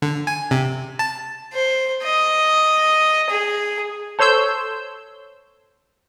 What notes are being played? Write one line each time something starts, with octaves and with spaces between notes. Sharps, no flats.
D3
G#5
C3
A5
C5
D#5
G#4
A4 C5 C#5 C6 E6 G6